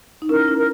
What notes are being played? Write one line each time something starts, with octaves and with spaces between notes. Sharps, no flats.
D#4
C#4 E4 A#4
C#4 E4
A#4